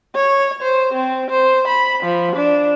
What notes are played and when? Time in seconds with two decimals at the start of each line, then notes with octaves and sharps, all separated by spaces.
0.15 C#5
0.62 C5
0.93 C4
1.30 C5
1.67 B5
2.03 F3
2.36 D4